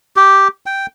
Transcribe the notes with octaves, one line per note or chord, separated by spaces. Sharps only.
G4
G5